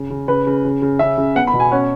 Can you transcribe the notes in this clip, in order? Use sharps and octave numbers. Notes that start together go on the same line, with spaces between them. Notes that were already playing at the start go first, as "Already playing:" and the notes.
Already playing: C#3
C#3
C#3 B4
C#3
C#3
C#3
C#3 E5
C#3
B3 F#5
B5
B2
G#5
C#4 F#5